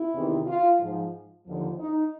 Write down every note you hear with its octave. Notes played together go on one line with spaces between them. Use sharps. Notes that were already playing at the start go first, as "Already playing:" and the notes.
Already playing: E4
E2 C3 D#3
F4
G#2 F3
D#2 D3 F3
D#4